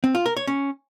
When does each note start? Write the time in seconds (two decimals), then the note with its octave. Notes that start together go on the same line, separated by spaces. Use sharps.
0.04 C4
0.15 F4
0.26 A#4
0.37 C#5
0.47 C#4